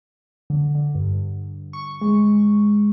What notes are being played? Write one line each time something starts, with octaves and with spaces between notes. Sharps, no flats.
D3
D3
G2
C#6
G#3